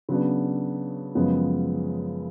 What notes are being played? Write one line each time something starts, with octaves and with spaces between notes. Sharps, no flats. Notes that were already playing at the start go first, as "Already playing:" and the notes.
C#3 F#3 B3 D4
F#2 C#3 F3 G#3 B3